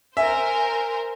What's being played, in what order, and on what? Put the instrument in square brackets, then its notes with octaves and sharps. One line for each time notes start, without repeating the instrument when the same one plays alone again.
[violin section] A#4 C5 [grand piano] E5 [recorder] G#5